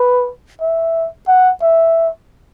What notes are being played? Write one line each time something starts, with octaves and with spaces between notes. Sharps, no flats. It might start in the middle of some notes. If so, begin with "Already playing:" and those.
Already playing: B4
E5
F#5
E5